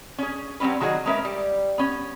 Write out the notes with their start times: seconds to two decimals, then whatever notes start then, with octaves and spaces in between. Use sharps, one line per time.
0.18 C#4 G#4
0.60 F#3 G3 C4 C#4 B4
0.80 D#3 F#3 F#4 G#4 D#5
1.06 G#3 A#3 C#4 A#4 B4 E5
1.25 G3
1.78 B3 C#4